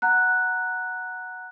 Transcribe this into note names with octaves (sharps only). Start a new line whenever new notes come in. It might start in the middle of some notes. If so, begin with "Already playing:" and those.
F#5 A#5 F#6